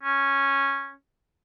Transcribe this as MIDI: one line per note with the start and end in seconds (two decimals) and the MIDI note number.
0.03 0.92 61